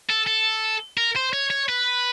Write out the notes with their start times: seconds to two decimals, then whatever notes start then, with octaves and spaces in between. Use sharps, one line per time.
0.10 A4
0.27 A4
0.97 A#4
1.16 C5
1.33 C#5
1.50 C#5
1.69 B4